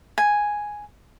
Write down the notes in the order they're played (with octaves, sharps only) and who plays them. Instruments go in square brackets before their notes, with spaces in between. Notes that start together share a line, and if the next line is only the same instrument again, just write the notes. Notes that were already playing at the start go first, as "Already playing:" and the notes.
[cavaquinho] G#5